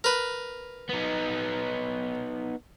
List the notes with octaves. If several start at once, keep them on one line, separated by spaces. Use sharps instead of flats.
A#4 B4
B3 D#4